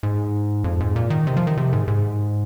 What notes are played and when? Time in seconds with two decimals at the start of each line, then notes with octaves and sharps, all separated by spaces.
0.03 G#2
0.64 F2
0.80 G#2
0.96 A#2
1.10 D#3
1.27 C3
1.37 F3
1.47 D#3
1.57 C3
1.73 G#2
1.88 G#2